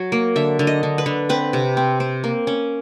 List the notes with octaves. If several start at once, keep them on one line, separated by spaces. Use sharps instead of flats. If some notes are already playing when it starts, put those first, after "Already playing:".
Already playing: F#3
A#3
D3 E5
D3
D#5
D3
B4
D3
C4 B4
C3
C4
C4
A#3
C#4